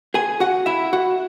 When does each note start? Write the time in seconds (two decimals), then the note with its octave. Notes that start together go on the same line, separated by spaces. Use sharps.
0.14 G#4 G#5
0.40 F#4 F#5
0.66 E4 E5
0.93 F#4 F#5